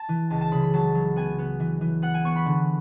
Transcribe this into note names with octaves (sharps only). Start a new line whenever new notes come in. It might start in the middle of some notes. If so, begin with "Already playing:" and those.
Already playing: A5
E3
C#2 A5
A5
C#3 B5
B5
F#3 A5
F#3
B3 G#5
B3
E3
E3
B3 F#5
G#5
B3 C#6
B5
D3